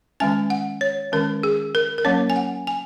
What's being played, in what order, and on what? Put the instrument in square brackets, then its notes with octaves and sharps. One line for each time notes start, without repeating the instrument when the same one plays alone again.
[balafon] D#3 G#3 C#4 G#5
F#5
C#5
D#3 G#3 C#4 A#4
G#4
A#4
A#4
F#3 A#3 C#4 C#5
G#5
F#5
G#5